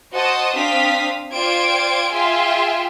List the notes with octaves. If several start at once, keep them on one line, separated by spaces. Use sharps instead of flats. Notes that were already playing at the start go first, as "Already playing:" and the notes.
F#4 C5 D#5 A5 D#6
C4 D4 F5 D#6 B6
F4 C5 D5 G5 G#6 D7
F4 G#4 E5 G5 G#5 C6